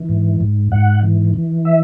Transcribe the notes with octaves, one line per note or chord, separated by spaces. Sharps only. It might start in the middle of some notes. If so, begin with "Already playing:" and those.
Already playing: E3
G#2
G#2
G#2 F#5
E3
E3
E5